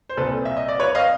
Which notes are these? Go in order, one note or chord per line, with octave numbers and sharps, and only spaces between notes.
C5
C2 A#2 A4 B4
E5
D#5
D5
B4 C#5
D#5 F5